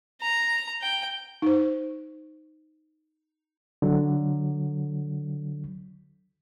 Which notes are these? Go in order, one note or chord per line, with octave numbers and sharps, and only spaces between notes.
A#5
G5
D#4 C5
D3 F#3